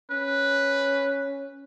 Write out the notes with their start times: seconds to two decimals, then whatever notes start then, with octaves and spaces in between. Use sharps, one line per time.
0.11 C#4 B4